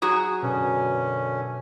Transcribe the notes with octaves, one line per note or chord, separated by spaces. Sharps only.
F#3 F#4 G#4
F#2 B2 D3 C#4